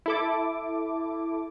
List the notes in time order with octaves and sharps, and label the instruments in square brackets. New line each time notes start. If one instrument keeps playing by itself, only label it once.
[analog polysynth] E4 A4 D6